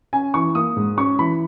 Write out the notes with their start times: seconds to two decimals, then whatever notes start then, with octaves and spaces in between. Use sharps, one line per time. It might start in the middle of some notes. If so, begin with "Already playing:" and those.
0.13 C#4 G#5
0.34 E3 C#6
0.55 A#3 D#6
0.77 G#2
0.97 C#4 C#6
1.19 E3 B5